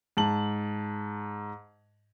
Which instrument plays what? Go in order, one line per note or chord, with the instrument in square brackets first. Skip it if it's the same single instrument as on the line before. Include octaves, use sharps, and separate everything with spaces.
[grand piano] G#2 A5 F#7